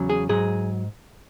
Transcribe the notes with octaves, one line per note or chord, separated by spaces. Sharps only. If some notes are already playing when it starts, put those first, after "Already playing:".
Already playing: E2 C#3 F#3
G#4
G#2 F#3 G#4